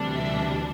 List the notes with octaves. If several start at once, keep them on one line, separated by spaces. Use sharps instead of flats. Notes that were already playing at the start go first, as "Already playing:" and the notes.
Already playing: D2 C3 E3 G3 D4
E5